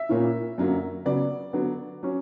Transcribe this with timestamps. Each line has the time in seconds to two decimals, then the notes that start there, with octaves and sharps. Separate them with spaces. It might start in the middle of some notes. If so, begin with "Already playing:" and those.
Already playing: E5
0.09 A#2 A#3 C#4 E4
0.58 F#2 D3 F#3 A#3
1.05 C#3 F#3 B3 D5
1.53 D3 F#3 B3
2.03 F#3 C#4